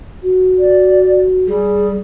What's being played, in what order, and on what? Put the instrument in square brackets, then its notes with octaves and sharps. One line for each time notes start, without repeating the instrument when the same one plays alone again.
[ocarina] F#4
[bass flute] D5
[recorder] G3 [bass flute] G#4